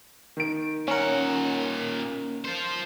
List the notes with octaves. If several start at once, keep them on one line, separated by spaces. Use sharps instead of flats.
D#3 D7
A#2 C#4 A#4 F#5
F4 C5